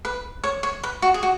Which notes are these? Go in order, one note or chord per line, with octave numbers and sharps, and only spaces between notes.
B4
C#5
C#5
B4
F#4
G#4
F#4